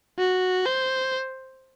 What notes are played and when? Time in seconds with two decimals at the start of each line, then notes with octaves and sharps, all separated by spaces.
0.19 F#4
0.66 C5